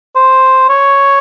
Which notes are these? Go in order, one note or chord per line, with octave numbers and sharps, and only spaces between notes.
C5
C#5